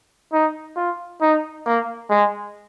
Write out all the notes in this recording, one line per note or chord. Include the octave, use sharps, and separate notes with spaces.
D#4
F4
D#4
A#3
G#3